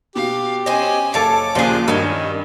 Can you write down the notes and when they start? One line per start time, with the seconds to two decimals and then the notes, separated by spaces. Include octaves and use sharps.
0.15 B2 G4 F5
0.66 C#4 C5 D#5 G#5
1.14 F#1 A4 C#5 F5 A5 D6
1.55 D#2 A#2 C#3 F3 D4 G#4
1.88 G2 D#3 C#4 D#5 G#5